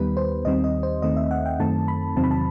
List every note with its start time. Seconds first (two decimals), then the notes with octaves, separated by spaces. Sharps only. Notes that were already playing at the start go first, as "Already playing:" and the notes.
Already playing: D#2 D#3 G3 B3 B4
0.17 C5
0.45 D#2 D#3 G3 C4 D#5
0.64 D#5
0.83 C5
1.02 D#2 D#3 A3 C4 D#5
1.17 E5
1.31 F#5
1.46 G5
1.59 F#2 D#3 A3 C4 A5
1.88 B5
2.16 E2 C3 D#3 F#3 C4 A5
2.24 B5
2.31 A5